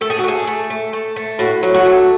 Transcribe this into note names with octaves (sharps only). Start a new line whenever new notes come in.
A3 A4
G#4
F#4
A3 G#4
A3
A3
A3
A3
A2 F#4
F#3
F#4
A3